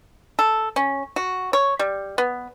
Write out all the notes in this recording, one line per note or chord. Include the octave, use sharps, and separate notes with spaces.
A4
C#4
F#4
C#5
G3
B3